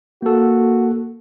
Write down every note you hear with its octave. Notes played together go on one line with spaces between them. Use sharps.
A#3 F#4 A4